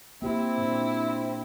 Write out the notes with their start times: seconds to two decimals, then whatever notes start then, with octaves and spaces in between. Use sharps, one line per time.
0.22 A#3 C4 E4 G4
0.57 A#2 D4